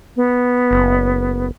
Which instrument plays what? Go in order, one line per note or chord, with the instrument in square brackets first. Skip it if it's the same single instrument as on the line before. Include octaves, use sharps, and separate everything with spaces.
[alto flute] B3
[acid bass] F#1